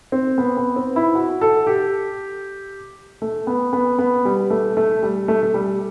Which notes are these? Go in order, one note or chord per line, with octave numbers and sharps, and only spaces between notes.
C4
B3
B3
C4
E4
F#4
A4
G4
A3
B3
B3
B3
G3
A3
A3
G3
A3
A3
G3